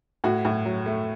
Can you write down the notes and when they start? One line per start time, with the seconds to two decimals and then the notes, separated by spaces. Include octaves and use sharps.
0.24 A2 F#4
0.45 A2
0.66 F#3
0.86 A3